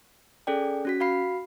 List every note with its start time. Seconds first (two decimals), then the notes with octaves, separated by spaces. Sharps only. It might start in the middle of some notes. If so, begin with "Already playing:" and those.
0.47 C#4 G#4 A4 D5 G5
0.85 C#4 F#4 B6
1.00 F#4 F5 B5 C7